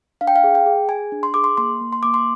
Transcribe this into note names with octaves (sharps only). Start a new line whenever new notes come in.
D4 F5
G5
F5
G#4
G5
G#4
G#4 G#5
D4
C6
G#4 D6
C6
A#3 C6
A#3
C6
A#3 D6
C6